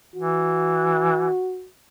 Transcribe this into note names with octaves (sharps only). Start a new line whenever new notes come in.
E3 F#4